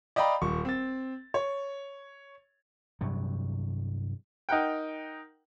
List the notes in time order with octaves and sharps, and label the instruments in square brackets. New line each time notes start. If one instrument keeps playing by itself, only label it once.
[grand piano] D5 D#5 F5 G5 A#5 B5
D#1 C#6
C4 A6
C#5
[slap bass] G2 C3 F#3
[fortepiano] D#4 A#4 F#5 G5